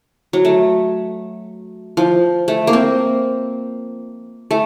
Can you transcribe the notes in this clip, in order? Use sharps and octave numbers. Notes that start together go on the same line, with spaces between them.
F#3
A3
F3
A3
A#3
C4
A3